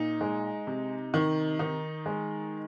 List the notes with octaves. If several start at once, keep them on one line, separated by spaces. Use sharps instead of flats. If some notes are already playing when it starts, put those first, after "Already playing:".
Already playing: A#2 D#4
G#3
C3
D#3
D#3 D#4
G#3